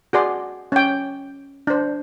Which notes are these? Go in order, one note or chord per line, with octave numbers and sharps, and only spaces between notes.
F#4 G#4 D5 C6
C#4 G5
D4 C5